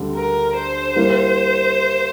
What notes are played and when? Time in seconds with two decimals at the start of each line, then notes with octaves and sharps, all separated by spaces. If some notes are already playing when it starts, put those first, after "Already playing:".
Already playing: D2 D3 G3 C4
0.15 A#4
0.56 C5
0.96 G3 A#3 E4